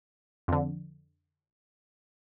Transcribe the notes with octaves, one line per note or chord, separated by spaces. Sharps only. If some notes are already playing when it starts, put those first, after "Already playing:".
F2 D3